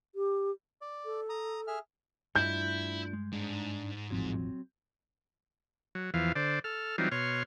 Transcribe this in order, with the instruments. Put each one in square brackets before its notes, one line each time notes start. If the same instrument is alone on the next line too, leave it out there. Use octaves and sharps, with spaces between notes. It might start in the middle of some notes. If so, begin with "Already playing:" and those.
[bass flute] G4
[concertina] D5
[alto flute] A4
[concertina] A#5 D#6
G#4 E5 F6
[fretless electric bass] G2 [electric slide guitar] A3 D4 F4 [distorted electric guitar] E4 [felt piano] G6
[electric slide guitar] G#3
[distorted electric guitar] G#2 [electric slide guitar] D4
[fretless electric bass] E1 A1 F3 [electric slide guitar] F#3 C4
[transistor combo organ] F#3
E2 E3 F3 F5
D3 C5 D5
A4 F6
E3 F#3 G3 C4 D#4 F4
B2 C#5 C6 F6